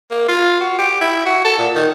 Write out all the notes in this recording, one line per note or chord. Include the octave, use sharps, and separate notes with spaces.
A#3
F4
F#4
G4
E4
F#4
A4
A#2
D#3